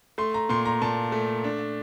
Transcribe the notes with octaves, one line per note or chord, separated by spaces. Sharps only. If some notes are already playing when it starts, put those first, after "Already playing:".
A3 C6
A#5
A#2 C6
A#5
A#2 A5
A3
D4